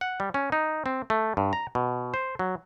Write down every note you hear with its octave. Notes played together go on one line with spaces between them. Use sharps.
F#5
G3
C#4
D#4
C4
A3
G2
A#5
B2
C5
F#3